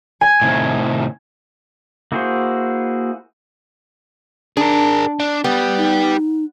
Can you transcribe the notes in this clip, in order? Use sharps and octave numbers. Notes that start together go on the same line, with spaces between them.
G#5
A2 C3 D#3
A#3 E4 F#4 G#4 C5
D4 G#4 A#4
D4
G3 B3 G4
D#4